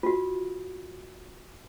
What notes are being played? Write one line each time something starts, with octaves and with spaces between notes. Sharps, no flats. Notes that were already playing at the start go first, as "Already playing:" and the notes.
F4 F#4